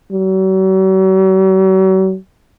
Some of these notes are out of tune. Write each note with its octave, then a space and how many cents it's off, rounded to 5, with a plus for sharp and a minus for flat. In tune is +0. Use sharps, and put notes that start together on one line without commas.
F#3 +45